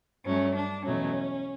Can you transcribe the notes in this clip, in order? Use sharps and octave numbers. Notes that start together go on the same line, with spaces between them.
G2 F#3 A3 C#4
D4
E2 B2 F#3 A3 C#4